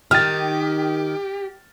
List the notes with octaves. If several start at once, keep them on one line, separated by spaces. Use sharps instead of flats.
D#3 G4 F6 A6